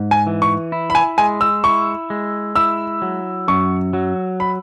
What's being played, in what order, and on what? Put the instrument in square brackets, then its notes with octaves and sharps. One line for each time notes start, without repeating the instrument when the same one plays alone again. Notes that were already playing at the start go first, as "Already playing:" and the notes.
Already playing: [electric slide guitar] G#2
[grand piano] G#5
[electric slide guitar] E3
[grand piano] C#6
[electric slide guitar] E4
[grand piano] B5
G#5
[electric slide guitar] G#3 [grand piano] G#5
[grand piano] E6
[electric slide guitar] E4 [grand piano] C#6
[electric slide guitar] G#3
[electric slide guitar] E4 [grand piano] E6
[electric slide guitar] F#3
[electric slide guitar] F#2 [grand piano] C#6
[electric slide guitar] F#3
[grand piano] B5